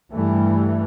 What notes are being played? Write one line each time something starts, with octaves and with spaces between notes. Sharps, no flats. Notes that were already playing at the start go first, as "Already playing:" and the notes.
G2 E3 G3 A3